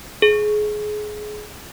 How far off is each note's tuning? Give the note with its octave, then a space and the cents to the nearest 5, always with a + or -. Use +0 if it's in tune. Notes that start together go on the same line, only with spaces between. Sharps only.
G#4 +25